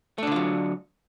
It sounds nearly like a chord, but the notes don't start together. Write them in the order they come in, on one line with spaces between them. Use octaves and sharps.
A3 D4 D3 F4 F#3